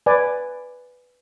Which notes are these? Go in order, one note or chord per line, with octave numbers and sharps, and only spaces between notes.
B4 D5 G#5